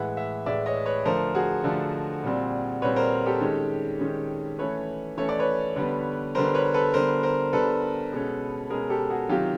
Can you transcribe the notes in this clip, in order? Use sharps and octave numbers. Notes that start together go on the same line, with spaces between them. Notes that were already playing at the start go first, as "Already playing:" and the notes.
Already playing: A2 E3 G#3 E5 F#5
E5 F#5
A2 E3 G#3 D5 E5
C#5 D#5
B4 C#5
D3 F3 A3 A#4 C5
F#4 G#4
D3 F3 A3
A#2 G3 C4
A#2 G3 C4 B4 C#5
A#4 C5
G4 A4
D#3 G#3 C#4
D#3 G#3 C#4
E3 A3 C#4 B4 C#5
E3 A3 C#4 C#5
D5
B4 C#5
D3 G3 B3
D3 G3 B3 A#4 C5
B4 C#5
A4 B4
D3 G3 B3 A#4 C5
A#4 C5
D3 G3 B3 A4 B4
B2 G#3 C#4
B2 G#3 C#4 G#4 A#4
G4 A4
F#4 G#4
C3 D#3 F#3 F4 G4